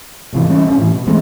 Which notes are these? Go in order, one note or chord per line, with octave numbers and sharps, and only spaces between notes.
G#2 C3 E3
E3 G3 C#4
D1 C#4 D4
A2 E3
B2
E3 G#3 A3 C4